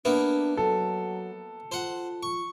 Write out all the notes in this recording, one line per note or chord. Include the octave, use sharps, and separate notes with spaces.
A#3 B3 D4 E4
F#3 A4
F4 C5 F#5
C#6